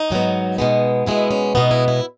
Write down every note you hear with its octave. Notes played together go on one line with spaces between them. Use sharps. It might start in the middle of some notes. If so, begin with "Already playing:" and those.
Already playing: D#4
G#2 F#3 B3
B2 G#3 B3
B2 G#3 B3 E4
C#4
B2 G#3 B3 D#4
E4
E4